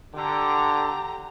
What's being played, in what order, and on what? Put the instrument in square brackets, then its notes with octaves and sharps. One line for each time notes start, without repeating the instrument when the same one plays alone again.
[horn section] D3 [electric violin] G4 A#5